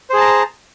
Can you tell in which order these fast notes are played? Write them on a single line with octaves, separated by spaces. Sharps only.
C5 G#4 A5 A#5